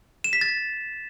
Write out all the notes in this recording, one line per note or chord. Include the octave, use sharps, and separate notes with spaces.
E7
B6
A6